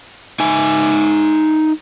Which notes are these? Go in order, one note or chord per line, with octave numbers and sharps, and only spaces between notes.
D#4 E5 G#5